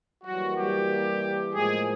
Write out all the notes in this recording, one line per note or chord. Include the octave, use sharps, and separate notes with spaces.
E3 F#3 G3 A#3 F#4
G3 G4
A2 F3 G#3 A#3 G#4